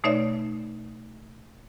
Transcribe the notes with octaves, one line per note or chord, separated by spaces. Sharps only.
B2 A3 D#4 C#5 D5 E5